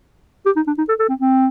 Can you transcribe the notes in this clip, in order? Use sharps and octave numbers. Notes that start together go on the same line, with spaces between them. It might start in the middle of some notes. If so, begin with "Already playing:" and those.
G4
D#4
D4
D#4
A4
A4
C4
C4